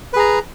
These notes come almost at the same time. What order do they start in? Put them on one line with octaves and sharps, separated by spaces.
B4 G#4 A#5